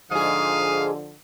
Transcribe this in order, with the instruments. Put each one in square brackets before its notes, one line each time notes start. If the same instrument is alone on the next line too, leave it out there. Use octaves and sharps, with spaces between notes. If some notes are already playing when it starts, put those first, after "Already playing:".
[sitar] G#2 G#4 [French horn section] D3 F3 [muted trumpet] F5 [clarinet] D#6